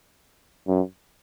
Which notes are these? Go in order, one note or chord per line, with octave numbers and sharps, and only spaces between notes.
F#2